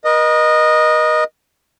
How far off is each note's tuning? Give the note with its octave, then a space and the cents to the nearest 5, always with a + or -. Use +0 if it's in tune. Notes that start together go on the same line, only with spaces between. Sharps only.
A#4 +45 D#5 -10